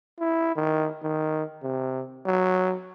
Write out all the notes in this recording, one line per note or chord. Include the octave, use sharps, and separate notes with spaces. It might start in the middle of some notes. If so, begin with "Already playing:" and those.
E4
D#3
D#3
C3
F#3